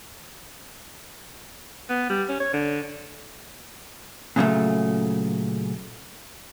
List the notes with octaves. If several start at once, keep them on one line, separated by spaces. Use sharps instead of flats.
B3
G3
C#4
C#5
D3
A#2 C#3 F#3 A3